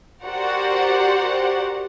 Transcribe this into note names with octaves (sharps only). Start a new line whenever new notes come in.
F#4 G4 A#4 C5 D5 F#5